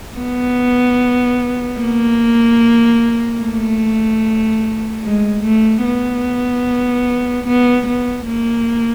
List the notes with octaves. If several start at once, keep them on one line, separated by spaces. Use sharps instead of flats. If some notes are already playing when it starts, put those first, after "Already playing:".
B3
A#3
A3
G#3
A3
B3
B3
B3
A#3